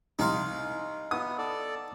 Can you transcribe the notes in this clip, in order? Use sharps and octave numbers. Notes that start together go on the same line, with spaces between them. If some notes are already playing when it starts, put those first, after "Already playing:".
C2 D#4 F5 C6
B3 D#6
A4 D5